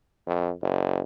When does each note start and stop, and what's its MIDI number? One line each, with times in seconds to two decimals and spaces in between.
0.27 0.52 41
0.62 1.01 30